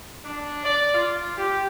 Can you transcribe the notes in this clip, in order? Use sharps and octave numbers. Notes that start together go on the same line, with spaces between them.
D4
D5
F4
G4